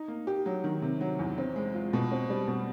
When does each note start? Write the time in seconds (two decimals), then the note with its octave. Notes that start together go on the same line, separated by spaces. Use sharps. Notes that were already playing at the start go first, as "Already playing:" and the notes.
Already playing: D#4
0.08 A#3
0.27 G4
0.46 F#3
0.64 D#3
0.82 C3
1.01 F#3
1.19 E2
1.38 C4
1.56 G#3
1.74 F4
1.93 B2
2.11 C4
2.30 G3
2.48 B2